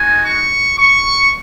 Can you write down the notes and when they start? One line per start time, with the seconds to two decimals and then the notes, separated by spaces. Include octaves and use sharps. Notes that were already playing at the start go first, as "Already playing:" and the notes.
Already playing: G#3 D#4 F#4 G#5
0.25 C#6
0.78 C#6